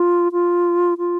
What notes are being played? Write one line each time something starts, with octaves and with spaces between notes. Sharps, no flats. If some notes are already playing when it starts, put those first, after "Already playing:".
Already playing: F4
F4
F4